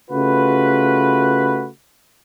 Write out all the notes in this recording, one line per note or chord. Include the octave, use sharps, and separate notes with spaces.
C#3 A3 F4 F#4 B4